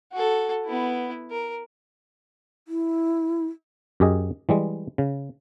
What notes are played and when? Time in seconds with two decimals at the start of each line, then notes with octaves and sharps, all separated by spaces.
0.13 F#4 A4
0.66 B3 E4
1.31 A#4
2.68 E4
4.00 F#2 G4 G#4 D#5
4.49 E3 G3 G#3
4.98 C#3